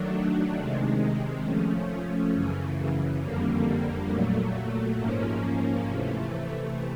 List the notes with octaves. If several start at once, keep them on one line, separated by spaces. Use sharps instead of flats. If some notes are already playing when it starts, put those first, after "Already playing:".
Already playing: D#3 F#3 A3 D4
C3 D#3 G#3
F3 A3 C#4
F#2 C#3 E3
F2 D3 G3 A#3
A#2 F#3 A3
G#2 F3 A#3 C#4
C3 E3 A3